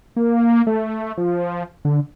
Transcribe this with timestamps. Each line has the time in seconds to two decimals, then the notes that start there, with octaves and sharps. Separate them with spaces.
0.16 A#3
0.67 A3
1.18 F3
1.85 D3